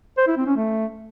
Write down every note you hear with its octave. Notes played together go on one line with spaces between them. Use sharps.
C5
E4
C4
C#4
A3